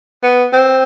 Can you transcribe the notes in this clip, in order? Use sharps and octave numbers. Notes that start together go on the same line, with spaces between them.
B3
C4